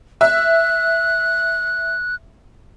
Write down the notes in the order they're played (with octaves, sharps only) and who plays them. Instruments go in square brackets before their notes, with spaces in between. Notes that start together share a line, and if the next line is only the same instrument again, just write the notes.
[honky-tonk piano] E5 [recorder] F#6